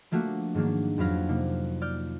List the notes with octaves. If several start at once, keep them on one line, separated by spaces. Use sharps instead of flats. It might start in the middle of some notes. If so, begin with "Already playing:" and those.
F3 A3 A#3 D4 F#4
G#2 D#3 F#3 A#3 D4
F2 F#3 B4 F5 A#6
C3 A#3 D#4
D5 F6 G6